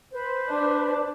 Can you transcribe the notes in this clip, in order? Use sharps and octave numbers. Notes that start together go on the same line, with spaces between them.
B4 C5
D4